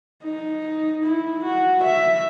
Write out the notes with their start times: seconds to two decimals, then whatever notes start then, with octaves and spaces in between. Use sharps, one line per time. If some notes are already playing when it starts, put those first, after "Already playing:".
0.24 D#4
1.03 E4
1.44 F#4
1.83 E5